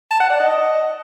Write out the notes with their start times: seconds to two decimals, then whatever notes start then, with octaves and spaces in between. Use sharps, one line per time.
0.11 A5
0.20 F#5
0.30 D5
0.40 D#5